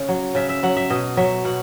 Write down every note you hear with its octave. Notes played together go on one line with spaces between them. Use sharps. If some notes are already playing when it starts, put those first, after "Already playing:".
Already playing: C#3 C#5
F#3
C#3 E5
E5
F#3 F#5
E5
B2 D#5
F#3 E5
B2 F#5